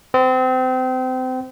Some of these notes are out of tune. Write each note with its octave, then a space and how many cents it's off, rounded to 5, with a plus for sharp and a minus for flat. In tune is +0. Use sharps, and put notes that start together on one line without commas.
C4 -30